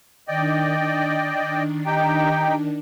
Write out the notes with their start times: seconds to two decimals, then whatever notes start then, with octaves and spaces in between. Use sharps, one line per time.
0.28 D#3 D4 D5 D#5 G5
1.86 D#4 G4 G5